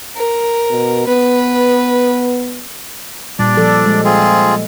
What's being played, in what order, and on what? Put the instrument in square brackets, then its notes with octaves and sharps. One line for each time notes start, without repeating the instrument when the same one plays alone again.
[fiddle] A#4
[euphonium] B2
[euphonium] B3 [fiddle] B4
[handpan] A#2 G3 [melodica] D4 D5
[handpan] F3 A4
G#3
[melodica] C4 F4 G#4